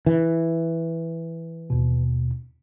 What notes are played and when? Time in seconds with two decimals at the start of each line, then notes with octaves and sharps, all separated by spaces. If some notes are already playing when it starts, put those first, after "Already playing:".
0.06 E3
1.70 D#2 B2